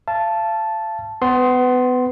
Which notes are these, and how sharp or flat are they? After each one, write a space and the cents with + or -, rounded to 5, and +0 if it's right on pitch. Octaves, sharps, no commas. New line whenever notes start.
F5 -40 A5 -5
B3 +25 C6 +0